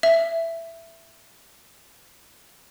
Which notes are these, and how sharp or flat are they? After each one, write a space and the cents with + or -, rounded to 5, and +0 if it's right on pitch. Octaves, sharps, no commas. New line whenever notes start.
E5 +10